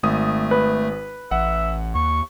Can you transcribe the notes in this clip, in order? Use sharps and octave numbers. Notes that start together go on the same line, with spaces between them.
G#1 A3 D#6
B4
A1 E5 F#5
D#2 C#6